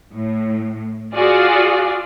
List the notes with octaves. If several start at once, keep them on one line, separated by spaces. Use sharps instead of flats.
A2
F4 F#4 G#4 D5